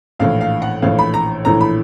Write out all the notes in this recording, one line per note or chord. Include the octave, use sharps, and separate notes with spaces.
A#1 A2 E3 F5
F5
F#5
A#1 A2 E3 F5
B5
A#5
A#1 A2 E3 A#5
B5